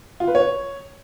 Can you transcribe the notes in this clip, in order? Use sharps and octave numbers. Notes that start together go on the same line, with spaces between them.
F4
B4
C#5